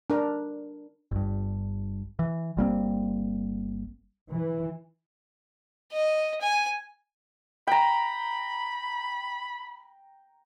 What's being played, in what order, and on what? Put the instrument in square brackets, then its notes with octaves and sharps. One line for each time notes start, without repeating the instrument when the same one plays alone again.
[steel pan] D4 A#4
[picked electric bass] G1 G2
E3
G1 G3 A#3 C4
[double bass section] E3
[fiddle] D#5
G#5
[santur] G5 A#5 [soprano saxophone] B5